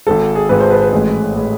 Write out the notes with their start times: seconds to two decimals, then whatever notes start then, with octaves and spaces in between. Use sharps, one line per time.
0.07 G#1 G#2 G#3 A4
0.35 G#4
0.49 G#1 G#2 G#3 B4
0.60 C5
0.71 B4
0.82 B4
0.92 A1 A2 G#3
1.36 A2 G#3